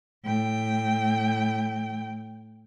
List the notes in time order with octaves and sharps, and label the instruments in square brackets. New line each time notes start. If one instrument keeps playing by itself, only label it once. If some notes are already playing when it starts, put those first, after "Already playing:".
[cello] A2 G5